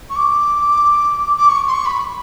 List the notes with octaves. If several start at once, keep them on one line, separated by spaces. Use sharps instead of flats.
C#6
D6
D6
C#6
C6
C#6
B5